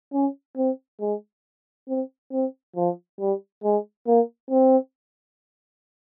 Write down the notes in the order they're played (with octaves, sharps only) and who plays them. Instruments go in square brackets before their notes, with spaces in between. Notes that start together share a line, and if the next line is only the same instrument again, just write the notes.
[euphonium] C#4
C4
G#3
C4
C4
F3
G3
G#3
A#3
C4